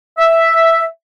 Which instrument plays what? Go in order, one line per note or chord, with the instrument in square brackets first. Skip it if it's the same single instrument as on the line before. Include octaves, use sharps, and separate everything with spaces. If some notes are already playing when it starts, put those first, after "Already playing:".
[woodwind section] E5